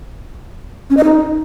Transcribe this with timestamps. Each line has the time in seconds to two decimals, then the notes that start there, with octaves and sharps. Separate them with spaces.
0.90 C#4
0.97 D#5
1.04 D#4